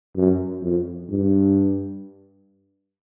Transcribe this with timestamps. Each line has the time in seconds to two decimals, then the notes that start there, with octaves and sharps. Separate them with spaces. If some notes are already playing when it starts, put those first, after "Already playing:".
0.15 F#2
0.62 F2
1.10 G2